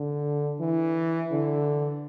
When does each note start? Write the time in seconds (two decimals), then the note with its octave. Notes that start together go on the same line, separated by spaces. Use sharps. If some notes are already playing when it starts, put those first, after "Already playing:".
Already playing: D3
0.60 E3
1.31 D3